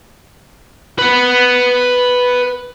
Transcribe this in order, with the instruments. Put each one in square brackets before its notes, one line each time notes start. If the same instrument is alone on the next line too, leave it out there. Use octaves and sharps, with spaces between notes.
[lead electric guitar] B4 F#5